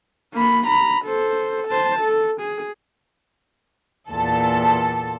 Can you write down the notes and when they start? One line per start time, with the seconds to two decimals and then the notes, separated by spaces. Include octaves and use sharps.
0.33 A#3 B5
0.67 A#5 B5
1.05 A4 C5
1.68 C5 A5
2.00 A4
2.41 G#4
4.11 E2 A#2 A4 A5